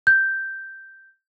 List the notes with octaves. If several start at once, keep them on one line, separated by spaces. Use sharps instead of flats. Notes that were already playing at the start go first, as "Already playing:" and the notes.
G6